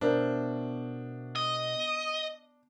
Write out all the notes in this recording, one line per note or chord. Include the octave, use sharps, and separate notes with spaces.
B2 D4 A#4 C5 E5
D#5